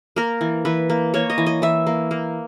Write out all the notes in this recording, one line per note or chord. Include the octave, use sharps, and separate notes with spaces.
A#3 A#4
E3
E3 B4
A#3
A#3 C#5
D#5
E3
D#5
E3 E5
A#3
A#3